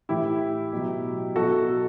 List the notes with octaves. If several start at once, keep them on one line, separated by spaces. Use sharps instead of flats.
A2 E3 E4 G4
B2 F#3
B2 F#3 F#4 A4